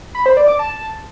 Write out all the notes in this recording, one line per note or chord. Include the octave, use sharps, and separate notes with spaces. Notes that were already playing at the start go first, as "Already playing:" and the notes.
B5
C5
D5
D6
A5